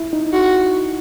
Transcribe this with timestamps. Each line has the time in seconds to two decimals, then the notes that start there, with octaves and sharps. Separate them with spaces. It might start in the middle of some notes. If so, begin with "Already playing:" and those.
Already playing: E4
0.13 D#4
0.33 F#4